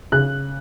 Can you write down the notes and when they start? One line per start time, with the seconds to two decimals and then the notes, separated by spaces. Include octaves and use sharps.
0.12 C#3 F#6